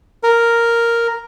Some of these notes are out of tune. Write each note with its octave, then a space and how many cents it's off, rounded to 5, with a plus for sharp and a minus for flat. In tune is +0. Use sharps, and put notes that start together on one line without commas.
A#4 +0